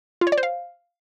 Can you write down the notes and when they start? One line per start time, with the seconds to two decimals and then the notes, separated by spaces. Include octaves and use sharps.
0.21 F4
0.27 C#5
0.32 D5
0.38 C5
0.43 F5